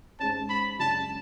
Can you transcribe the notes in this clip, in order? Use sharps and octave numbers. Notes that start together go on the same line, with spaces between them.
G#2 G#3 C#4 A5
B5
F#2 C#3 G#3 D4 A5